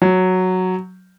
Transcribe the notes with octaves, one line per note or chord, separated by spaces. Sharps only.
F#3